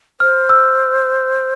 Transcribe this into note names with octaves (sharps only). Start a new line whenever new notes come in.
C5 F6
E6